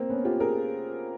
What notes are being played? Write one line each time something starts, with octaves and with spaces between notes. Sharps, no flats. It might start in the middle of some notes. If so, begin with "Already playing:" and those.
Already playing: A#3 C4
B3 C#4
F4 G4
G#4 A#4